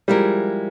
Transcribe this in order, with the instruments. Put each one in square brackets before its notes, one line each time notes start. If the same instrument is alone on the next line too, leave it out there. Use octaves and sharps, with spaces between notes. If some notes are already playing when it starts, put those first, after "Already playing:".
[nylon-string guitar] F3 G#3 E4 A#4 [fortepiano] G3